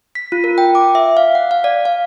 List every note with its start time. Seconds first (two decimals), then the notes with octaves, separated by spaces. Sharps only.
0.15 B6
0.32 F4
0.44 A#4
0.58 G5
0.75 D6
0.95 E5
1.17 F5
1.35 F#5
1.51 F5
1.64 D5
1.85 F5